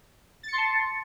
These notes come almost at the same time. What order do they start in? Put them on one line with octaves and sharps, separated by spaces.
A6 C#7 C6 A5